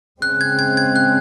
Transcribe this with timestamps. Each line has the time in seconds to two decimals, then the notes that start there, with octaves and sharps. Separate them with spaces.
0.21 C#3 G#3 C4 F#6
0.41 G#6
0.59 G#6
0.77 G#6
0.96 F#6